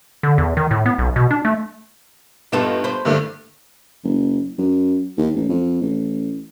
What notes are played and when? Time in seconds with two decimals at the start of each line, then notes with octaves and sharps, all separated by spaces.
0.23 D3
0.38 E2
0.57 D#3
0.71 A2
0.86 B3
0.98 B1
1.16 B2
1.31 D4
1.45 A3
2.52 G2 B3 D#4 F4 A4 E7
2.84 B4 C5
3.05 G2 D3 A3
4.04 F#1
4.58 F#2
5.18 D#2
5.35 A1
5.49 F2
5.82 A1